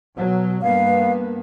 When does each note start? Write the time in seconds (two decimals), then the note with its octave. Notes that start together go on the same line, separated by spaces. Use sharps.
0.16 B2 F#3
0.62 G2 A#3 B3 F5